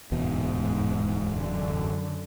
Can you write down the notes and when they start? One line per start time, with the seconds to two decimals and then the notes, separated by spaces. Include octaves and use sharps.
0.12 D1 E2 G#2 B2
1.36 F#2 D3